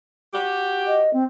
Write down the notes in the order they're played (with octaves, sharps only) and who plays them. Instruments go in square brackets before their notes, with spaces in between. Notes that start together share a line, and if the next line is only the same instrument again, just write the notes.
[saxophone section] F#4 G4
[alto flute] D#5
C4